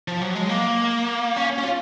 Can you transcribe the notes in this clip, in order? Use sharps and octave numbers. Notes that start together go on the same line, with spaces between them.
F3
F#3
G#3
A#3
C#4
C#4
F4